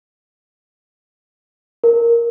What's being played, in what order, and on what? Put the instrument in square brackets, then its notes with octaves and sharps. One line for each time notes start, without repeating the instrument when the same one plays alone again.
[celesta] A#4